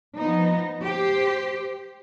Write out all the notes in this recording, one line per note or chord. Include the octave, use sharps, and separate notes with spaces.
F3 B3 D#4
G4 C5